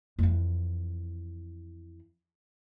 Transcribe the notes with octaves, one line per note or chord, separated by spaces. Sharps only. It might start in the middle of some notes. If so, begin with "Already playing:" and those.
F2 E3